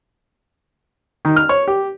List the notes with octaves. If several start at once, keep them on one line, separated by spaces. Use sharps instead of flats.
D#3
F6
C#5
G4